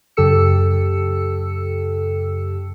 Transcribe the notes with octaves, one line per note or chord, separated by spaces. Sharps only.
F#2 C#3 G4 A4 E6 C#7